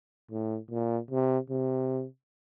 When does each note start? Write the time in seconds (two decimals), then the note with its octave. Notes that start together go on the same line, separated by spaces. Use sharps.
0.31 A2
0.71 A#2
1.11 C3
1.50 C3